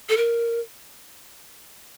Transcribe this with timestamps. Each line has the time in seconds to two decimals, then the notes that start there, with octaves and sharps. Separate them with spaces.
0.09 A4
0.17 A#4